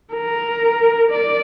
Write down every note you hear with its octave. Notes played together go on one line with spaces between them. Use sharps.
A#4
D5